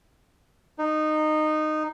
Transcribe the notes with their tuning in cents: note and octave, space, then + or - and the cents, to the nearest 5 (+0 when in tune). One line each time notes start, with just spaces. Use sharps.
D#4 -15